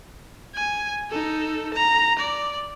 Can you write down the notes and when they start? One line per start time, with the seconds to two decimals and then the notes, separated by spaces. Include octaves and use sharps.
0.54 G#5
1.10 D#4 A4
1.74 A#5
2.19 D5